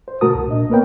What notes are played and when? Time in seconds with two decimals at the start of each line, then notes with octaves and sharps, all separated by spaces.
0.08 C5
0.21 C3 A3 F#4 A#4 A5 D#6
0.34 C#2
0.47 A#2 D4 D#5
0.70 A#3 B3 A#4 B4 C#5 G5